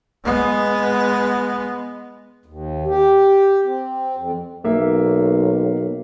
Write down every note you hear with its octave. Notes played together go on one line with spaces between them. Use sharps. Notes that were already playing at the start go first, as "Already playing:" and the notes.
G#3 B3
D#2
G4
C4
F2
B1 A#3 E5